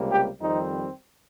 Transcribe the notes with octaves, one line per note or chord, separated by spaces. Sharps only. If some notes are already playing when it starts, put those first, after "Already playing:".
Already playing: C#2 C3 G3 A#3
G4
F2 D#3 G3 C4 D#4